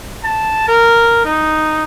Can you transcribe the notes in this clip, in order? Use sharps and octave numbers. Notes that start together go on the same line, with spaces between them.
A5
A#4
D#4